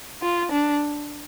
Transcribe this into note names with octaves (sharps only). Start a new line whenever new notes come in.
F4
D4